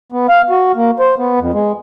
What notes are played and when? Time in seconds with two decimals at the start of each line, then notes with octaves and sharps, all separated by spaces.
0.12 B3
0.29 F5
0.50 F#4
0.76 A#3
0.99 C5
1.19 B3
1.40 F2
1.54 G#3